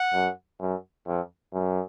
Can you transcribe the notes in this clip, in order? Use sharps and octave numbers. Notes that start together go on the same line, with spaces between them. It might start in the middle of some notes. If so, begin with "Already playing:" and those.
Already playing: F#5
F#2
F#2
F2
F#2